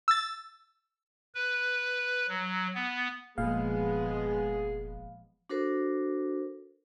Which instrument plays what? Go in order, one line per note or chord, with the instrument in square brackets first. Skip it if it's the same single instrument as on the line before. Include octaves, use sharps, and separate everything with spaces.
[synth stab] E6 A6
[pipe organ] B4
F#3
B3
[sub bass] F1 [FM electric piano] A#2 F5 [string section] F3 G#3 B3 [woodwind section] G#4
[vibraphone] D4 F#4 A4 A#4 C5